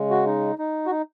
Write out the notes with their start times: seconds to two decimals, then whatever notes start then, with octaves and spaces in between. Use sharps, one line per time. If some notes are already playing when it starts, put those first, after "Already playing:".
Already playing: C#3 G#3
0.10 F#4
0.26 D#4
0.59 D#4
0.86 F#4
0.91 D#4